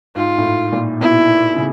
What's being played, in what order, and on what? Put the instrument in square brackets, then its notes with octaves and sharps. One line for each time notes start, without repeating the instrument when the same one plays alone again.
[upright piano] G#2 [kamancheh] F4
[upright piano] A2
G#2
A#2
[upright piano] B2 [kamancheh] E4
[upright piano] C#3